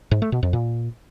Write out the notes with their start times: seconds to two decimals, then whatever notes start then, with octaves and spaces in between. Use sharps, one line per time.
0.11 G#2
0.22 A3
0.32 B2
0.43 F2
0.53 A#2